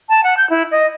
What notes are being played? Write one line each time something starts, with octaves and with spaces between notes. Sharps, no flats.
A5
F#5
G6
E4
D#5